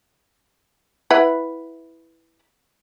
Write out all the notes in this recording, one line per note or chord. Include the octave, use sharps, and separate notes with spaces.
E4 B4 F#5